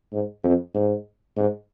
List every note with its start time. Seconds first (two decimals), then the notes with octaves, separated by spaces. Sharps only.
0.13 G#2
0.44 F2
0.75 G#2
1.37 G#2